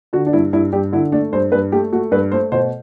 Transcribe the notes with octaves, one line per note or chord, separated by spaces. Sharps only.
D3 F#4
D4
G2 E4
G2 E4
G2 G4
D3 E4
A3 D4
G2 C5
G2 B4
A3 G4
A3 F#4
G2 B4
A3 C5
B2 C5